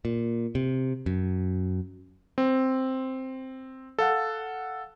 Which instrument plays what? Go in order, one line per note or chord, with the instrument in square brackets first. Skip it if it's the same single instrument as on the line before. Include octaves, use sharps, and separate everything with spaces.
[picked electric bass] A#2
C3
F#2
[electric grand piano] C4
A4 F5 F#5